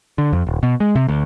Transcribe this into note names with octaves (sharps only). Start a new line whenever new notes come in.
D3
F2
D#1
B2
G#3
C3
D2